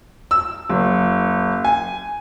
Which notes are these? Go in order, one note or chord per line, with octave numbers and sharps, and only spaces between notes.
E6
F#1
G#5